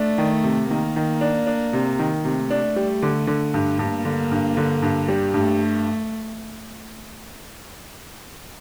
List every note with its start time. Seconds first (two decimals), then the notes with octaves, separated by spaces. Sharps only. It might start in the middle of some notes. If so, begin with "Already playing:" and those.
Already playing: A3 D4
0.18 D#3
0.44 C3
0.70 D#3 A#3
0.96 D#3
1.21 D4
1.47 D4
1.73 C3
1.99 D#3
2.24 C3 A3
2.50 D4
2.76 G3
3.02 D3
3.27 D3
3.54 G2
3.79 G2 A#3
4.05 D3
4.31 G2
4.57 D3
4.82 G2
5.08 G3
5.33 G2 A3